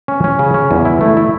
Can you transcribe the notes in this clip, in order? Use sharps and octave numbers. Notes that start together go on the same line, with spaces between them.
C#4
C#4
C#3
C#4
E2
E4
A3
E4